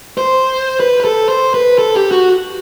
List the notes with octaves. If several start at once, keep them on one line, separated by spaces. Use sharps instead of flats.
C5
B4
B4
A4
C5
B4
A4
G4
F#4